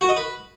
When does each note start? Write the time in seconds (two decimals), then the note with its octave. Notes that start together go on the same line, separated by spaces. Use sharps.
0.01 F#4
0.09 D#5
0.16 B4